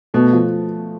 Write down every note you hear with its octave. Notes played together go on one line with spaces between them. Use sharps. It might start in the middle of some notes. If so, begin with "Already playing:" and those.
B2 A3
F3